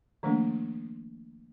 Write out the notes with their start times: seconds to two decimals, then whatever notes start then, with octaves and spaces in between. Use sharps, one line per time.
0.23 D#3 F3 A3 A#3 D4